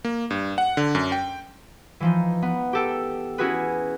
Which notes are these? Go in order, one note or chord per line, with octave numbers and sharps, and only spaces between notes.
A#3
G2
F#5
D3
F#2
G5
E3 F3 D#4
B3
G4 A4 G5
C#4 E4 F#4 G#4 B4